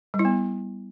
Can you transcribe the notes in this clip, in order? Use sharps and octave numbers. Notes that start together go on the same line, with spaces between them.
G3
E4
B3